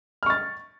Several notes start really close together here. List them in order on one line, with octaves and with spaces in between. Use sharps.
F6 C#6 A6